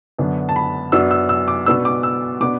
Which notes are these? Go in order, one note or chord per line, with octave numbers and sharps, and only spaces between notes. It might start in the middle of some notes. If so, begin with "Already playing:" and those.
F#2 D3 B3 D4
A5
B5
F#2 F#3 B3 D4 E6
E6
E6
D6
B2 B3 D4 E6
D6
E6
B2 B3 D4 D6